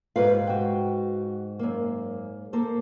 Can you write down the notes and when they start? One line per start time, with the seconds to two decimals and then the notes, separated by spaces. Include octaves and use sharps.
0.16 G#2 F4 G4 B4 F5
0.47 F#4 G5
1.59 F#2 A#3
2.53 A#3 A4 C5